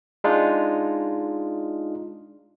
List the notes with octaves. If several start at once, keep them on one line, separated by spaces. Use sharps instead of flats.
G#3 D4 D#4 F4